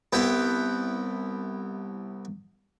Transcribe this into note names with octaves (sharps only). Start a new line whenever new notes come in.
C2 B3 E4 B4 G5